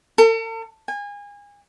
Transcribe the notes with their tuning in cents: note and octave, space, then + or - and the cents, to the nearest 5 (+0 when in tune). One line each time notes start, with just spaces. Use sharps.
A4 +45
G#5 -30